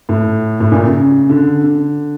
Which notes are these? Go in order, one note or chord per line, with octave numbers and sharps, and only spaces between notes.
A2
A2
A#2
C#3
D3
D3